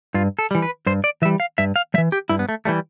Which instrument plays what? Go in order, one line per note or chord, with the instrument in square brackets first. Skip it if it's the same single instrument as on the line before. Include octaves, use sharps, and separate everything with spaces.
[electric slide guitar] G2 F4
A4
E3 G3
B4
G2 C5
D5
E3 E5
G3
F5
G2 E5
F5
G3 E5
E3
G4
G2 E4
B3
A3
E3 G3 A3